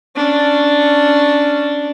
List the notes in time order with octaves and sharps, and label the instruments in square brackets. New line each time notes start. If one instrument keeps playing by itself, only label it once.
[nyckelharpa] C#4 D4